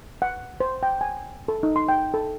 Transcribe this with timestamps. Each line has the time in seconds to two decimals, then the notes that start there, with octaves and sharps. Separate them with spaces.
0.22 F#5
0.60 C5
0.83 G5
1.01 G#5
1.48 A4
1.63 D#4
1.76 C6
1.89 G5
2.14 A4